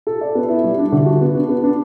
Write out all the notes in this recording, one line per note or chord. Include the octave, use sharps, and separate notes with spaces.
A4
D5
B3
E4
G3
D4
D3
F#4
B3
D4
B3
D4